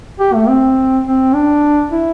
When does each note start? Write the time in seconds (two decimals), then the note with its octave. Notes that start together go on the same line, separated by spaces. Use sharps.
0.20 G4
0.34 A3
0.48 C4
1.06 C4
1.34 D4
1.92 E4